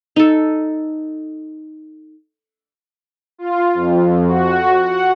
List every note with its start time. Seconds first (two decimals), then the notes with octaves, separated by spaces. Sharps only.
0.16 D#4 A4
3.38 F4
3.74 F2
4.27 F#4
4.81 F#5